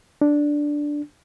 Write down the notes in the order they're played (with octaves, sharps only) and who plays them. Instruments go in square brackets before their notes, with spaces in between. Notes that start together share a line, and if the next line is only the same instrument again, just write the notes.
[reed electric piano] D4